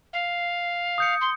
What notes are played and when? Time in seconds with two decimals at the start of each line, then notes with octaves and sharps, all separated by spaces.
0.13 F5
0.98 D#6 G6 C#7
1.21 C6